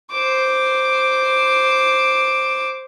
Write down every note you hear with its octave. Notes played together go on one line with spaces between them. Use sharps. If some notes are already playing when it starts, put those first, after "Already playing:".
C5 D6